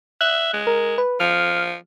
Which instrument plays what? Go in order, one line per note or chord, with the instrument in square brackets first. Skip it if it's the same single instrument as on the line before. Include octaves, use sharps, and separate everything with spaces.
[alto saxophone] E5 [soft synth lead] F#6
[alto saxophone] G#3
[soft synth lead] A#4
B4
[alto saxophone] F3 [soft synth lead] F6